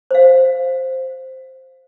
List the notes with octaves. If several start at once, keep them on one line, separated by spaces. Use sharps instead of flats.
C5 F5